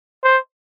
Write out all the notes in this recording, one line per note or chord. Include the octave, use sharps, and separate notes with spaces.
C5